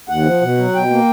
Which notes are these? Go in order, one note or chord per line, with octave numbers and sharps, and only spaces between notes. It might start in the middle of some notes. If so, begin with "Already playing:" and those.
D#2 F#5
F3
B2
F#3
B2 G5
A#3